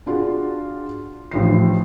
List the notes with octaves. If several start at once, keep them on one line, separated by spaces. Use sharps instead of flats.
D4 F4 F#4 G#4
A1 F3 C7